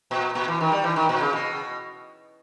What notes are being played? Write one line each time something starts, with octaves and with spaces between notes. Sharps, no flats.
A#2
A#2
E3
D#3
G3
E3
D#3
A#2
C#3
B2